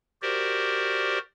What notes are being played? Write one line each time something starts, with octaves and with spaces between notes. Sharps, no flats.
F#4 G4 A#4 C5 D5